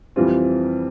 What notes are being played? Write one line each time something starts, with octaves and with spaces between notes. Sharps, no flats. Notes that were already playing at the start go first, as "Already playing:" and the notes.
F2 E3 G3 C4 F4